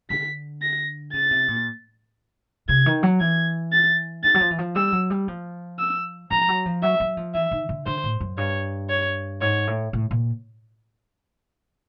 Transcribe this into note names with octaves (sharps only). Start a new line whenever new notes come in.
D3 B6
A#6
C#3 A6
C3
A#2
C3 G#6
D#3
F#3
E3 G#6
A6
D#3 A6
F#3
F3
E3
F3
G3 E6
F#3
G3
F3
E6
F3 A#5
F#3
F3
F#3 E5
F#3
F3
E3 E5
D#3
D3
D3 C5
A2
F#2
G2 C#5
C#5
G#2 C#5
A2
A2
A#2